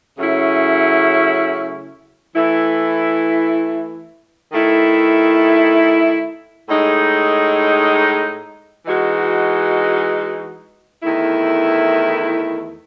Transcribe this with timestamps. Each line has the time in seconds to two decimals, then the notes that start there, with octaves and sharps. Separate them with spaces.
0.18 C#3 F#3 A3 C#4 E4
2.35 E3 A3 E4
4.52 D#3 A3 E4
6.69 A2 G#3 D#4
8.86 E3 G#3 D#4 F#4
11.03 E2 D#3 A3 E4